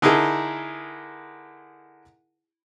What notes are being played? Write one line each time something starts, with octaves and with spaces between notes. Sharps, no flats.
D3 D#4 E4 G#4 A#4